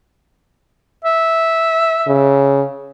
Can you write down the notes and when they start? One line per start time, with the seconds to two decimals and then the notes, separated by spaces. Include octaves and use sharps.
1.05 E5
2.07 C#3